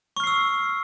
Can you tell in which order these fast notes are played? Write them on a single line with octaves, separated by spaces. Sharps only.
C#6 F6 C7 E6